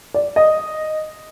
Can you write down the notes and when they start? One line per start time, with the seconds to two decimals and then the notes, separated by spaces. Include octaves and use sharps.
0.14 D5
0.36 D#5